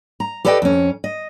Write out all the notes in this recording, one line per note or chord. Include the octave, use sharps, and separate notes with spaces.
A#5
G4 A4 B4 D5 D#5 G5
F2 C#4
D#5